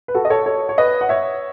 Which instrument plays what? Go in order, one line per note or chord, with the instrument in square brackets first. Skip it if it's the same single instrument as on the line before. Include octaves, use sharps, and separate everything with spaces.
[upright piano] B4
F#4 A4
D#5
A4 C#5
A4 C#5
C#5
B4 D#5
F#5
C#5 E5